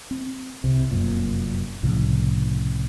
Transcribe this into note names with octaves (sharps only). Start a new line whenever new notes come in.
C4
C2 C3
F1 F#2 A#2
C2 A2 C#3 F3